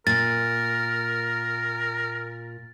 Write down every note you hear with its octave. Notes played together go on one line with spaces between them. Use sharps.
A#2 A#4 A6